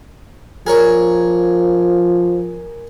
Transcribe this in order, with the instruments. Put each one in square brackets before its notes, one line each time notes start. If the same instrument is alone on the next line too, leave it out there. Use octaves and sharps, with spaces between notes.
[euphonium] F3 [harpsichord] G#4 A#4 C#5